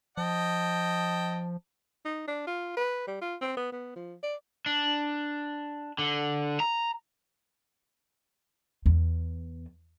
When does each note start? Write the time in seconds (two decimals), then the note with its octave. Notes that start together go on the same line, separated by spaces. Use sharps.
0.17 F3 D#5 G5 A5
2.05 D#4
2.28 D4
2.47 F4
2.77 B4
3.08 G3
3.21 F4
3.41 C4
3.57 B3
3.72 B3
3.96 F3
4.23 D5
4.66 D4
5.99 D3
6.60 A#5
8.86 E2